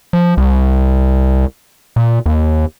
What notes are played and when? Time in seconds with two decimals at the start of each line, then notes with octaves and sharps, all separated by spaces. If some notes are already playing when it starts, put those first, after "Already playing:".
0.13 F3
0.37 C2
1.96 A#2
2.26 D#2